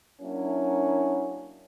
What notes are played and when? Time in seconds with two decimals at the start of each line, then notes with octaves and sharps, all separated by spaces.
0.20 F#3 A#3 C#4 D4 E4